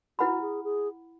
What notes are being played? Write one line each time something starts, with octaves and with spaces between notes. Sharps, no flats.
E4 F#4 B4 F#5 B5
G#4
G#4